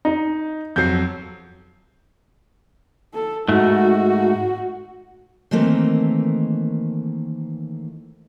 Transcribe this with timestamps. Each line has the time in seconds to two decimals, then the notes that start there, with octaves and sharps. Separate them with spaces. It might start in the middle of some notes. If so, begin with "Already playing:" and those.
0.05 D#4
0.76 F2 F#3 G6 C7
3.14 A4
3.48 G#2 A3 F#4
5.51 D#3 E3 A3 A#3 C4